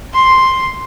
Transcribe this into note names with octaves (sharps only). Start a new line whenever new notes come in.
C6